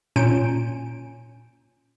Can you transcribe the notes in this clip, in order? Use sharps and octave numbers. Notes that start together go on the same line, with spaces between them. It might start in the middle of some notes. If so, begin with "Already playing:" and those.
A#2 C#4 G6 D7